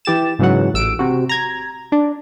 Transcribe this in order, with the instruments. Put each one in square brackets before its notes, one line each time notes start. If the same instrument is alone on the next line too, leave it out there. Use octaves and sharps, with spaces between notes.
[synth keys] E3 G4 A6 E7
G#2 C#3 E3 F#3 F#5
A1 E6 D7
C3 F#4
A#5 G#6
D4